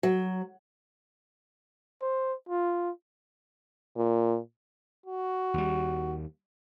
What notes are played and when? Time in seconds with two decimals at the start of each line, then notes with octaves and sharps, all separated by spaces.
0.03 F#3
2.02 C5
2.49 F4
3.97 A#2
5.06 F#4
5.54 D#2 G3